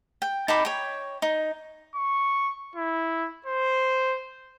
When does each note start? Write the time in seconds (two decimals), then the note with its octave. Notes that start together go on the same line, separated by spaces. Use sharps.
0.22 G5
0.48 D#4 A5 B5 D6
0.65 C#5 G5
1.22 D#4
1.95 C#6
2.75 E4
3.46 C5